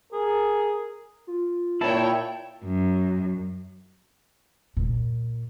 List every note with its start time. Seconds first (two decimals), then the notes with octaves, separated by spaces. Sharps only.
0.13 G#4 A#4
1.27 F4
1.81 A#2 E4 C#5 G5 A5
2.64 F#2
4.77 A#2